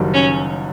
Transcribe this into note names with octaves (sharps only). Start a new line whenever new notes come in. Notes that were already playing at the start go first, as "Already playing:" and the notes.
Already playing: F#1 F#2 D#3 G3
C#4